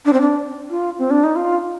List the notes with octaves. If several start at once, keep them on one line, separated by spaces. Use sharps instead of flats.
D4
C4
D4
F4
C4
D4
D#4
F4